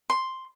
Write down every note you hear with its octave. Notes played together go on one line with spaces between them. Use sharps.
C6